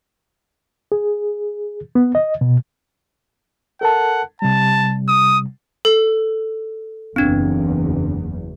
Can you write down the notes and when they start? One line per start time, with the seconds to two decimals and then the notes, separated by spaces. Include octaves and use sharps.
0.92 G#4
1.95 B3
2.15 D#5
2.41 B2
3.81 A4 A#4 F#5 A5
4.42 C3 G3 A5
5.09 D#6
5.85 A4
7.16 F#1 E2 C4 D4